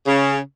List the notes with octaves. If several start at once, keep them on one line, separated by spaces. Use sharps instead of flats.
C#3